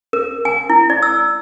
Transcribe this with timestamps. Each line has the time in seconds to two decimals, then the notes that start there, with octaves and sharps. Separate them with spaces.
0.13 A#4
0.45 G#5
0.70 E4
0.90 D5
1.02 E6